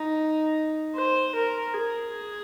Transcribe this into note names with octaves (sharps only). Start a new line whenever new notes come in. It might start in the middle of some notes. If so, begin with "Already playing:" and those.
Already playing: D#4
C5
A#4
G#4